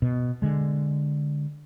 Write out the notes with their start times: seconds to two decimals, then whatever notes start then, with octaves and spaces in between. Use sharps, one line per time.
0.02 B2
0.42 D3 G#3